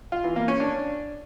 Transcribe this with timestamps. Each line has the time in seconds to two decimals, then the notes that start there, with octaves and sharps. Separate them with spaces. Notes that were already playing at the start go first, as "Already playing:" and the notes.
0.12 F4
0.24 E3
0.36 A#3
0.48 C#4
0.60 D4